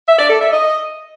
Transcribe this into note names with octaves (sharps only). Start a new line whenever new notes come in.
E5
D5
A4
E5
D#5